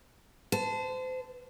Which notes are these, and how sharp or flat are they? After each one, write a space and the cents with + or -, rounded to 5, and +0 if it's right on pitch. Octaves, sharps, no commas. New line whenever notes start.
C5 -35 A5 +0